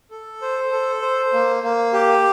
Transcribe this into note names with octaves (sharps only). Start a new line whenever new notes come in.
A4
C5
A4
C5
A#3
A#3
G4